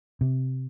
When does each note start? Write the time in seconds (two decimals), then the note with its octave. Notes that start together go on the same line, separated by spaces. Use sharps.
0.21 C3